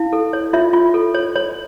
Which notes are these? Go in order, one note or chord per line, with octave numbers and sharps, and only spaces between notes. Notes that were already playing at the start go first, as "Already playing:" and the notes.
Already playing: E4 F5
A4
C#5
F4 C#5 E5
F4
A4
C#5
C#5